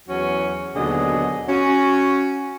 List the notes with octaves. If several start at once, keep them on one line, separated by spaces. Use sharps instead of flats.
E2 E3 F#3 C#4 F#4
D#2 B2 D3 F#3 G#4 D#5
C#4 F#4